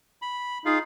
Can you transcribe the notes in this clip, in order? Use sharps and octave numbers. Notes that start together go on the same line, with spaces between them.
B5
D#4 F4 G#4 F5